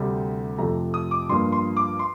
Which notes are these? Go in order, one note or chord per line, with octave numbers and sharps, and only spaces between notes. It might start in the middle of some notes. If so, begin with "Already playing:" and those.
Already playing: D2 C3 G3
F2 C3 F3 A3 A#5
D#6
D6
G2 F3 A#3 C6
C6
D6
C6